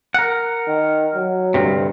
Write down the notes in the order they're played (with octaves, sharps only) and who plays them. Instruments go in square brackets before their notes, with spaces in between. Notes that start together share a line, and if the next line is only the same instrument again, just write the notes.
[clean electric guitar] A#4 F#5
[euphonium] D#3
F#3
[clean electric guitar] D2 G2 C3